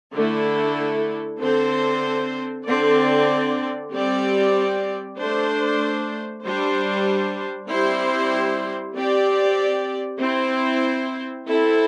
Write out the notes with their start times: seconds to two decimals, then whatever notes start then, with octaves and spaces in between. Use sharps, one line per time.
0.14 D3 A3 E4 A4
1.40 D3 C4 A4 C5
2.65 D3 C4 A4 D5
3.92 G3 C4 G4 D5
5.17 A3 D4 C5
6.44 G3 D4 C5
7.69 G3 C4 E4 G4 C5
8.95 C4 G4 D5
10.21 C4 E4 C5
11.47 C4 E4 A4